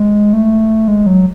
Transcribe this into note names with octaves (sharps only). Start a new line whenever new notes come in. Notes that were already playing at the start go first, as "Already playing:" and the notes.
Already playing: G#3
A3
G#3
F#3